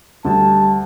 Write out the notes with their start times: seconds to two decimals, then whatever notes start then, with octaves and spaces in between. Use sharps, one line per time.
0.25 D2 G3 A5